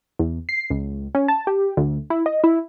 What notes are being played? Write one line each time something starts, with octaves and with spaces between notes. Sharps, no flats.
E2
C7
C#2
C#4
A5
G4
D2
E4
D#5
E4